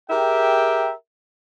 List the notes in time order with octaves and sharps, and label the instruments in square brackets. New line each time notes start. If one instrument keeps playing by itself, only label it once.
[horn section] G4 G#4 A#4 E5 G5